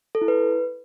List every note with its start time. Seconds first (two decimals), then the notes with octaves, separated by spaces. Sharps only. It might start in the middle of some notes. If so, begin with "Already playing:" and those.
0.15 A4
0.21 E4
0.28 B4